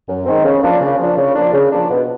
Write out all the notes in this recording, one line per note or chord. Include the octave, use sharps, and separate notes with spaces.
F#2
D#3 G#3 C4
C#3
F3 A#3 D4
C#3
F3 A#3 D4
C#3
F3 A#3 D4
C#3
F3 A#3 D4
B2